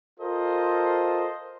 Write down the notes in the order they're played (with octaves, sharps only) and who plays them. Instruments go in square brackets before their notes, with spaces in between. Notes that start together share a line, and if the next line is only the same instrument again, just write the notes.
[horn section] F4 A4 A#4 C5 D#5